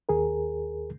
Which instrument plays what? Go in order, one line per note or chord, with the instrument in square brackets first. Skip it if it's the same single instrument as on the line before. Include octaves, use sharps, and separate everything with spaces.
[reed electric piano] D#2 G#4 A#4